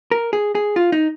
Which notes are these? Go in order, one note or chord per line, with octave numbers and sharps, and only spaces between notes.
A#4
G#4
G#4
F4
D#4